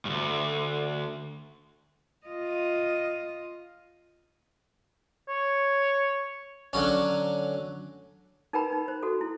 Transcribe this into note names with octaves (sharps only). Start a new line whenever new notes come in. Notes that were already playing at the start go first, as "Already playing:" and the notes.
D2 G2
F4 D#5
C#5
D3 F#3 C#4
D#4 A#4 B4 G5 A#5 B5
D#4
C5
F#4 A4
E4